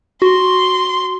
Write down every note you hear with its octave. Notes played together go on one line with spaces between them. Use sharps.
F#4 C6